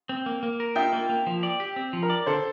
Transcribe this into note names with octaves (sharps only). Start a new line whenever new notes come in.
C4
A#3
A#3
A#4
F4 E5 G5
A#3
A#3
F3
D5
G4
C4
F3
A#4
D5
D3 A4 C5